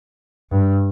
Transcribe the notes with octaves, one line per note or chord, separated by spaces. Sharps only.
G2